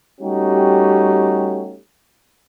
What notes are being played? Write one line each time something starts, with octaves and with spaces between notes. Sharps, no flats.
G3 A3 C#4 D#4 F#4 G4